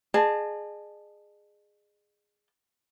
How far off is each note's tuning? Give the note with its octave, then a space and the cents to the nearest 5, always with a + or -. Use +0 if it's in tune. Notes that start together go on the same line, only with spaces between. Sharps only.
G#4 +0 D#5 -40 A5 +0